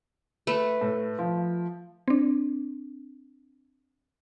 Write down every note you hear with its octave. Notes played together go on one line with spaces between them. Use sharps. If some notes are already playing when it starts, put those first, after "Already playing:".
A3 B4
A2
F3
C4 D4